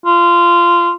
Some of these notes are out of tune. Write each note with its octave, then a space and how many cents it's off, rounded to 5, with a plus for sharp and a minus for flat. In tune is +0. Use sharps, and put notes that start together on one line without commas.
F4 -20